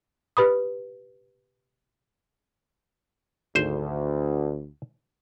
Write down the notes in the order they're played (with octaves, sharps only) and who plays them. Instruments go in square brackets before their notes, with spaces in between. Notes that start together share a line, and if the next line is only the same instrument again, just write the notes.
[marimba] G4 B4 B5 D#6
[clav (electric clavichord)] G#1 C5 [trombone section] D2